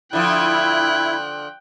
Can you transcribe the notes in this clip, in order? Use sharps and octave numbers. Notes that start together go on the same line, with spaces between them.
D3 F3 E4 G5 F#6